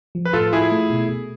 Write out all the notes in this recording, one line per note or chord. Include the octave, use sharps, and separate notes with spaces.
F3
B4
A2 F4 A4
E4 F4 G#4
A3
B2
B2